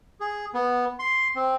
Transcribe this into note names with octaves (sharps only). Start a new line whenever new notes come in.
G#4
B3
C6
C4